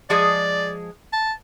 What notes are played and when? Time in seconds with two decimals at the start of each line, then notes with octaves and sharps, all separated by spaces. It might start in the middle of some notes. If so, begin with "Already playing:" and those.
0.10 F3 G#3 G#4 D5
1.13 A5